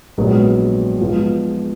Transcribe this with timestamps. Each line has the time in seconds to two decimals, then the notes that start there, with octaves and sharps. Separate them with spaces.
0.18 A#1 G#2 F#3 B3
1.00 G#2 F3 B3 F4